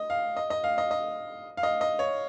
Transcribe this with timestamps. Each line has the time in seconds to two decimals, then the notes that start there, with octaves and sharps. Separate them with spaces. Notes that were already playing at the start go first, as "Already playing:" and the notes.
Already playing: D#5
0.10 F5
0.36 D#5
0.50 D#5
0.64 F5
0.78 D#5
0.91 D#5
1.57 F5
1.63 D#5
1.81 D#5
1.99 C#5